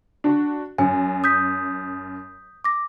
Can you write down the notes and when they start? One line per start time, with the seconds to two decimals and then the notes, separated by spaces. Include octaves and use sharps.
0.24 D4 F#4
0.78 F#2 G#5
1.24 D#6 G6 B6
2.64 D6 A#6